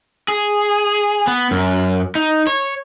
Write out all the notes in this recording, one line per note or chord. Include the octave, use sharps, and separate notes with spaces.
G#4
B3
F#2
D#4
C#5